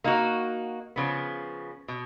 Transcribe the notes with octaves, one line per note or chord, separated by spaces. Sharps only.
A#3 D#4 F#4
C#3 F3 B3
B2